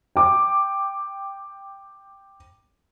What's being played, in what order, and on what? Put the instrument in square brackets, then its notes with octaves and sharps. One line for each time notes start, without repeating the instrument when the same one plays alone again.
[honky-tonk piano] G5 D6